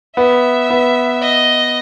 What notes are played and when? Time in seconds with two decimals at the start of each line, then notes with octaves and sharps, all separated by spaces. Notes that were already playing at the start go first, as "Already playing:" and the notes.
0.17 B3 E5
0.70 B3
1.22 D#5